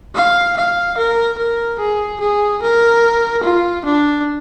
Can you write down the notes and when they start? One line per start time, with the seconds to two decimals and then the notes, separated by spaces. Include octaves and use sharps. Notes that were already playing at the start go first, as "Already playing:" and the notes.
0.15 F5
0.57 F5
0.98 A#4
1.38 A#4
1.80 G#4
2.20 G#4
2.62 A#4
3.43 F4
3.85 D4